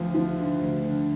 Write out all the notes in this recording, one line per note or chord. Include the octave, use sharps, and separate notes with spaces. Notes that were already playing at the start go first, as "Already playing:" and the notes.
Already playing: D2 F3
F3
D3
D2
D3